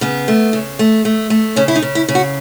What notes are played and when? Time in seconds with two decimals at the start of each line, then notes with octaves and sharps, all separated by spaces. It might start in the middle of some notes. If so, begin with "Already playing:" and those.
0.01 C#3 B3
0.28 A3
0.53 C#3
0.79 A3
1.05 A3
1.30 A3
1.56 C#3 C#4
1.68 E4
1.76 D#4
1.82 C#3
1.95 E4
2.08 C#3
2.15 F#4